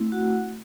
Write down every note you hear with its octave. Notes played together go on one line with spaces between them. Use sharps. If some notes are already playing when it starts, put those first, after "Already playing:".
Already playing: A3 C4 E4
F#4 F#5